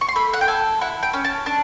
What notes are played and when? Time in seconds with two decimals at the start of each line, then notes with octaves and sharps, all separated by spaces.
0.01 C#6
0.08 C6
0.16 A3 B5
0.33 F#5
0.41 G5
0.48 A4 G#5
0.81 E4 F#5
1.03 G5
1.13 C#4
1.25 A5
1.46 D4 A5